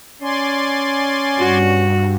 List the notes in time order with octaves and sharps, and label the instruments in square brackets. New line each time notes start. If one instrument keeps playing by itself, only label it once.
[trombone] C#4 [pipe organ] D5 G#5 C6
[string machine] G2 [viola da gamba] F#4